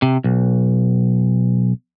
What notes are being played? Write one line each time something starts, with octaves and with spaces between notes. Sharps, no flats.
C3
B1